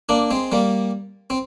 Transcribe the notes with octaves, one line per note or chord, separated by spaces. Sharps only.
A#3 D4
G#3 C4
G3 A#3
C4